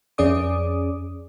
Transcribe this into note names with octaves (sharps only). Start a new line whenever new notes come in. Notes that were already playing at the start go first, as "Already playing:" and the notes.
F2 C#4 G#4 D5 D6 D#6